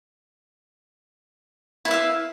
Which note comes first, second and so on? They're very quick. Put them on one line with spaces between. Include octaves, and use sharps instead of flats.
E4 B4 E5 F5